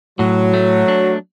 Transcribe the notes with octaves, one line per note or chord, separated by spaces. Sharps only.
A2 F#3
A3
D4